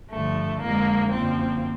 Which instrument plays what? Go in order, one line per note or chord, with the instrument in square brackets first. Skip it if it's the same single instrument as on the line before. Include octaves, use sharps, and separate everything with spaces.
[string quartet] G2 D3 F3 A3
F2 D3 F3 G#3 A#3
F#2 D3 F3 A#3 C4